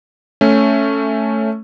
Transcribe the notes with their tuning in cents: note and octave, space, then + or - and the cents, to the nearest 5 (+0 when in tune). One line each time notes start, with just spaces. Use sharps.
A3 +0 C#4 +0